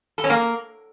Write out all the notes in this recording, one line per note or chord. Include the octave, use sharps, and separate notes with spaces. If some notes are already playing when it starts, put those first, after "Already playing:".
A4
C#4
A#3